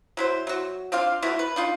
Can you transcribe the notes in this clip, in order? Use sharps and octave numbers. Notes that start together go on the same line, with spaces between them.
F#3 E4 C5
F#3 F#4
C4 D4 F4 F5
A3 B3 E4 F#4
B4
D4 D#4 F4